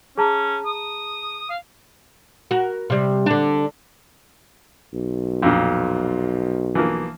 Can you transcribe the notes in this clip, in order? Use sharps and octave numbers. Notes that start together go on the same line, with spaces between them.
C#4 G#4 A5 A#5
D#6
F5
F#4 A#4
C3 G3
D3 D4
B1
F2 A#2
E3 F3 A#3